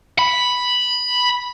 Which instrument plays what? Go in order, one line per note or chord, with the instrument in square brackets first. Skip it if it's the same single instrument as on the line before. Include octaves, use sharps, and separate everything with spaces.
[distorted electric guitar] B5